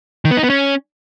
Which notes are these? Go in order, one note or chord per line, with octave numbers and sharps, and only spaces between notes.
D#3
B3
D#4
B3
C#4